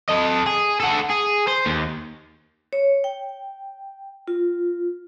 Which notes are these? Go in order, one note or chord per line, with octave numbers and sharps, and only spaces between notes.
A4 D#5
G#4
F#4 A4
G#4
C5
D#2
C#5
G5
F4